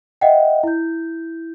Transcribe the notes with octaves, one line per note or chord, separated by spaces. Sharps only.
D#5 E5 F#5 G5
E4 G6